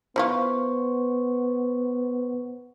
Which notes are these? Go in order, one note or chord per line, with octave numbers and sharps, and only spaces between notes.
F#3 B3 E4 F4 C5 C#6